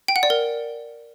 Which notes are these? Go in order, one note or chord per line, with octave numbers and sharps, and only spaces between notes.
G5
F#5
D5
A#4